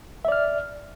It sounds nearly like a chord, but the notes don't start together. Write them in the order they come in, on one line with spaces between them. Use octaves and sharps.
E5 D5 F6